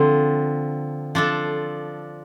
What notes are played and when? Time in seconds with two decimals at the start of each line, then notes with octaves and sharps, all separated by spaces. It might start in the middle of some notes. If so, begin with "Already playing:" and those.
Already playing: D3 F3 C4
1.15 F3 D4 A4